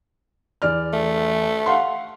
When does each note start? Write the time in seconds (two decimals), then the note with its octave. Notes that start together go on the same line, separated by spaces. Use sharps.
0.62 E2 D5 F6
0.93 A3
1.66 F5 F#5 C6